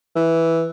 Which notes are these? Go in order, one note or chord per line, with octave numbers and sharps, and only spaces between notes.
E3